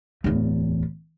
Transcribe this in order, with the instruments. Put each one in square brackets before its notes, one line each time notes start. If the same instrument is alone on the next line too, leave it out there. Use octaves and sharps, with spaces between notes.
[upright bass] D1 E2